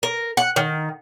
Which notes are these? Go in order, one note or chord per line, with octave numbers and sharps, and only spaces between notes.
A#4
F#5
D#3